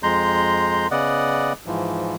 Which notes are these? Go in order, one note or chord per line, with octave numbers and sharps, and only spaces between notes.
F2 G#3 A#5 C6 G6
C#3 B3 D5 D#5 F#5
G#2 E3 F3